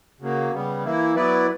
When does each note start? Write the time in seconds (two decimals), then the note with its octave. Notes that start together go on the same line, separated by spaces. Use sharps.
0.21 C#3 F#3 A#3
0.53 C#3 G3 B3
0.84 E3 A#3 E4
1.15 F#3 B3 E4 B4 D5